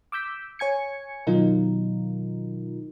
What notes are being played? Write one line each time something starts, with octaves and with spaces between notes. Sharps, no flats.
D6 E6 G6 B6
C#5 G#5 G#6 C#7
B2 D#3 F#3 D#4 F4 A#4